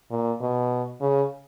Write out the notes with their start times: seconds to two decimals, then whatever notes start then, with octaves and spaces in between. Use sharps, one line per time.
0.11 A#2
0.40 B2
1.01 C#3